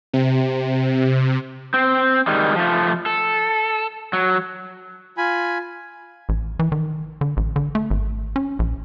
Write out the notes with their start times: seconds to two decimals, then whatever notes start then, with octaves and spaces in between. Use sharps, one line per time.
0.13 C3
1.74 C4
2.27 D#3 G3 G#3
2.56 F3 A3
3.06 A4
4.13 F#3
5.18 F4 G#5 B5
6.29 A1
6.59 E3
6.72 D#3
7.21 D3
7.37 A1
7.56 D3
7.75 A3
7.90 G#1
8.36 C#4
8.59 A#1